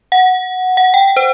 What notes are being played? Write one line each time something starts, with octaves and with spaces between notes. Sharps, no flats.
F#5
F#5
G5
C5